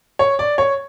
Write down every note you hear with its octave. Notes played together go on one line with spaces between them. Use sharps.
C#5
D5
C#5